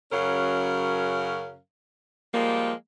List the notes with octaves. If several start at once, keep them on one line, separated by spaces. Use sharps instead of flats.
F#2 C#3 F#3 C#4 A#4 F5
F3 G3 G#3 A#3